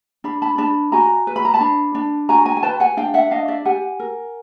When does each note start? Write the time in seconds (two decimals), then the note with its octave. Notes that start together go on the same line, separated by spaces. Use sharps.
0.24 D4 B5
0.42 A5 B5
0.58 D4 A5 B5
0.92 F#4 G#5 A#5
1.27 B4
1.36 B5
1.45 A#5
1.54 A5 B5
1.61 D4
1.95 D4
2.29 F#4 G#5 A#5
2.46 G#5 A#5
2.57 G#5
2.63 B4 G5 A5
2.80 F#5 G#5
2.97 D4 F5 G5
3.14 E5 F#5
3.31 D4 D#5 F5
3.48 D5 E5
3.65 G4 F#5 G#5
4.00 A#4